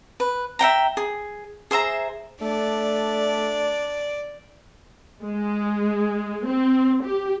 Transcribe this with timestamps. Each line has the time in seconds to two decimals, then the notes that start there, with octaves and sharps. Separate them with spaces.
0.20 B4
0.59 E5 F#5 G5 A#5
0.97 G#4
1.71 G#4 C5 E5 A#5
2.41 A3 D4 D5
5.24 G#3
6.46 C4
7.04 G4